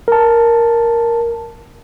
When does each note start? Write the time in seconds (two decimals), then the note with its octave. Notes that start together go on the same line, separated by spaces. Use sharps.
0.08 A#4 A5